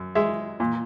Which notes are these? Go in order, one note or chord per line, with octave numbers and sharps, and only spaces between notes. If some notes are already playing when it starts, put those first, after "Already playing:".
Already playing: F#2
G#3 E5
A#2